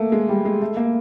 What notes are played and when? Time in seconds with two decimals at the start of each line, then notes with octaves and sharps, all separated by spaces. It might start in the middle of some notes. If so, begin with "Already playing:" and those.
Already playing: A3 A#3
0.12 G#3
0.29 G3
0.45 G#3
0.62 A3
0.77 A#3